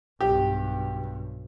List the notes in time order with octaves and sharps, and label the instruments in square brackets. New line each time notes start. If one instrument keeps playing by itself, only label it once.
[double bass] B1 G2 [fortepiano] G4